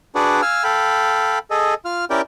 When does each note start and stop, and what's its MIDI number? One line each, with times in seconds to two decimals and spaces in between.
0.15 0.41 62
0.15 0.41 66
0.15 0.41 68
0.15 0.41 71
0.15 0.41 74
0.15 0.41 78
0.42 0.64 77
0.42 0.64 80
0.42 0.64 88
0.42 0.64 89
0.64 1.39 69
0.64 1.39 77
0.64 1.39 79
0.64 1.39 83
1.51 1.74 68
1.51 1.74 69
1.51 1.74 75
1.85 2.05 65
1.85 2.05 89
2.10 2.21 61
2.10 2.21 64
2.10 2.21 67
2.10 2.21 70
2.10 2.21 74
2.10 2.21 79